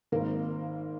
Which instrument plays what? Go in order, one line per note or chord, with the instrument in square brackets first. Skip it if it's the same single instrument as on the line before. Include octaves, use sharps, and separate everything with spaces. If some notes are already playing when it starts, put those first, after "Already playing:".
[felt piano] G#1 G#2 D#3 A#3 A#4